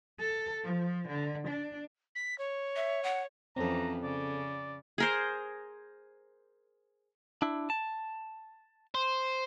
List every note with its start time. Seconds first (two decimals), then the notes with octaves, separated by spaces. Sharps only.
0.20 A4
0.64 F3
1.08 D3
1.48 D4
2.15 B6
2.38 C#5
2.76 E5
3.03 F#5
3.56 F2 E3 C4 C#4 A4 A#5
4.03 C#3 D5
4.98 G#4 A#4 C5
7.42 D4 E4
7.70 A5
8.95 C5